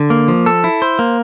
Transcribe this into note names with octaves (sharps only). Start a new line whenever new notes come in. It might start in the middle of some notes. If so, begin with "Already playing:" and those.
Already playing: D3
A#3
F3
A4
E4
C5
A#3